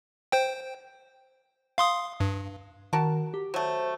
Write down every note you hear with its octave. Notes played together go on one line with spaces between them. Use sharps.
C5 G5
F5 C6 D#6
G2
D#3 F#4 A#4 A5
G4
F#3 A3 C5